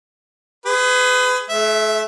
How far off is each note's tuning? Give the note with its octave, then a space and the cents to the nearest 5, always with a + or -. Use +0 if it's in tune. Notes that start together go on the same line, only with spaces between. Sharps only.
G#4 +0 B4 +35
A3 -40 E5 +0